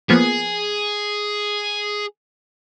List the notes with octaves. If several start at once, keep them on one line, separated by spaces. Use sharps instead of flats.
F3 A#3 B3 G#4